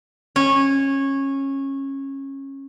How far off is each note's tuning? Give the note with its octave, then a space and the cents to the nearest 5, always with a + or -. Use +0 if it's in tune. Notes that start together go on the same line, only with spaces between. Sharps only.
C#4 -20